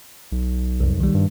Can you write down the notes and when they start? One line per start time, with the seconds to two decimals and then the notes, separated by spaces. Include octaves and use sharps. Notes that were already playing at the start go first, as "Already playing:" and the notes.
0.32 B1
0.80 C2 F2
1.00 D#3 G3
1.14 G2